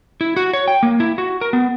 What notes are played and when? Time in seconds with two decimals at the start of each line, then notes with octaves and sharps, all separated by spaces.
0.21 E4
0.37 F#4
0.53 C#5
0.68 G5
0.83 A#3
1.00 E4
1.18 F#4
1.41 A#4
1.53 B3